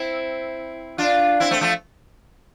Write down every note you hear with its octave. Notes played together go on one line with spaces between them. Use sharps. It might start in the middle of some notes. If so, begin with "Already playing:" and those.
Already playing: C4 E4
D4 F4
C4 E4
A3 C4
F3 A3